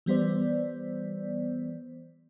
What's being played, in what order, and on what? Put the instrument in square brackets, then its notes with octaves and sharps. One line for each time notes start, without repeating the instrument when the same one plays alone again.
[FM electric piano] E3 G3 B3 C5 D5